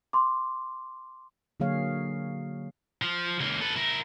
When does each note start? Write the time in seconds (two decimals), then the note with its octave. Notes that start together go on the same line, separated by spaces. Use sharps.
0.13 C6 D6
1.60 D3 F#3 A#3 G#4 C#5 F5
3.02 F3
3.41 C#2 A#3
3.61 A4 B4
3.76 E4 A#4